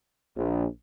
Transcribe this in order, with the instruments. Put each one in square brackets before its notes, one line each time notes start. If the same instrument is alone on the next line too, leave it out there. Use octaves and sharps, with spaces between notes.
[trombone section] A#1